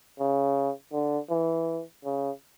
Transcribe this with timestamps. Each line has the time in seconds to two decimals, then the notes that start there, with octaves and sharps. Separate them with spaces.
0.19 C#3
0.93 D3
1.30 E3
2.05 C#3